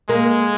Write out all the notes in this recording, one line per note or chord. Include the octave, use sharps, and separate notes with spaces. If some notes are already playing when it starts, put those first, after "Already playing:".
G#3 A#3